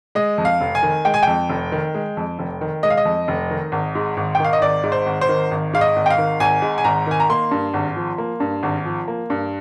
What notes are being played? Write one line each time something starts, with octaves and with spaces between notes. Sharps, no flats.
G#3 D#5
F2
F5
F1
G#5
D#3
G#3 G5
G#5
F2 G5
F1
D#3
G#3
F2
F1
D#3
G#3 D#5
F5
D#5
F2
F1
D#3
G#1
G#2
G#1
G5
D#3 F5
D#5
G#1 D5
G#2
C5
G#1
C5
D#3
G#1
G#2 F5
D#5
G#1
G5
F5
D#3
G#1 G#5
G#2
G#5
G#1 A#5
D#3 G#5
A#5
A#3 C6
G2
G#1
F3
A#3
G2
G#1
F3
A#3
G2